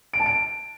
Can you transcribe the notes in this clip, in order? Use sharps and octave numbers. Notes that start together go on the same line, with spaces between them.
D7
A5
D7